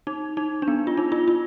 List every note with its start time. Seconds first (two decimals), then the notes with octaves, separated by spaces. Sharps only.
0.07 D#4
0.37 D#4
0.62 D4
0.68 B3
0.87 F4
0.97 D#4
1.12 F4
1.28 F4